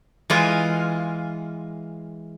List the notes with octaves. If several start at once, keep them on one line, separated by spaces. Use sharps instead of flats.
E3 G#3 F4